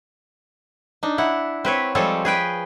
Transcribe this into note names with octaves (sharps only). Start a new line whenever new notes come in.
D4 D#4
E4 F#5
C4 B4 C#5
F3 G3 G#3 C4 A4 C#5
G#4 B4 G5